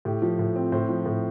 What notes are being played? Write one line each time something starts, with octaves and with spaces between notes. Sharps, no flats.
A2 G4
F3
A2
C4
A2 C5
F3
A2